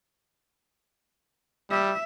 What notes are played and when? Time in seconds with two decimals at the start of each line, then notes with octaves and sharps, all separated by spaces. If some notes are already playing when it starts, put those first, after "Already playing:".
1.71 G3 E5